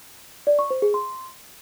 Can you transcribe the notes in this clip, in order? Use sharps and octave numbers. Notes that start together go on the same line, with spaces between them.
D5
C#6
C5
G#4
C6